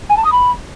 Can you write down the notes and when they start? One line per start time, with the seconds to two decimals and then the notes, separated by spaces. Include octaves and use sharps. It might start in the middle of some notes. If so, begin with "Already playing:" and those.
0.09 G#5
0.17 A5
0.24 D#6
0.32 B5